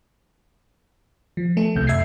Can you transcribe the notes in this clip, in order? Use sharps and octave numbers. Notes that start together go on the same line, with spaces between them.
F3
A3 A4
C2 C3 G6
F#2 E5 G#6 C7